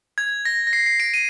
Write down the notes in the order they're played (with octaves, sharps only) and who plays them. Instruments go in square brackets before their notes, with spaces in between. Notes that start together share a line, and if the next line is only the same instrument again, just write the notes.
[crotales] G#6
A#6
A#6
C7
C7
D7
D#7